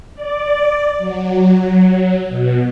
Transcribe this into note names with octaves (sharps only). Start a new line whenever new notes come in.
D5
F#3
B2